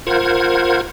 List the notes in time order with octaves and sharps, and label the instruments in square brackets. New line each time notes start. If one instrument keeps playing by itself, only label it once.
[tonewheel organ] F4 A#4 C5 F#5 G#6